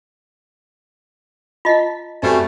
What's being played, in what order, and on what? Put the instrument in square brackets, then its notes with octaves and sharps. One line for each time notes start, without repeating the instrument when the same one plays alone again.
[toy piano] F4 D#5 [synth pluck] A5 A#5 B6
[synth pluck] F#2 C4 G#5 [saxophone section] B2 G3 A3